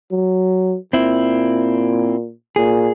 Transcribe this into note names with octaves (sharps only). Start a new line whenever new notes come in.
F#3
A#2 C4 E4
A#2 G#4